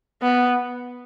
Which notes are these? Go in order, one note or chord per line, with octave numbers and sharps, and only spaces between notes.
B3